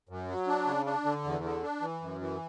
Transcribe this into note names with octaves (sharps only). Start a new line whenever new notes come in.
F#2
F#3
D4
C#3
D4
D3
E2
D3
D4
E3
F#2
E3